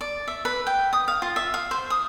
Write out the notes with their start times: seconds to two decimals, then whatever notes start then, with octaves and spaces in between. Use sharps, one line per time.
0.01 D5
0.28 E5
0.45 B4
0.67 G5
0.93 D#6
1.08 F5
1.22 F4
1.36 E5
1.54 F5
1.71 C5
1.90 D#6